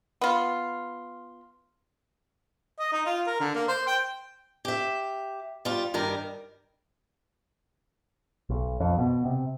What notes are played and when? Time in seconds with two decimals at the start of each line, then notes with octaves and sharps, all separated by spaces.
0.21 B3 F4
2.79 D#5
2.92 D#4
3.06 F4
3.27 A#4
3.40 D3
3.55 A#3
3.68 C5
3.87 G5
4.65 G4 E5
5.65 G3 F4
5.94 G2 D#3 G3 A#4
8.49 B1
8.80 F2
8.98 B2
9.25 C3